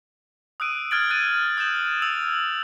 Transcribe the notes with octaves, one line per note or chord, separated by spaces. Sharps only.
D#6 E6 F#6 D7 D#7
F6 F#6 G#6 A6 D7 F#7
F#6 A6 D#7
D#6 G6 E7 F#7
E6 F7 F#7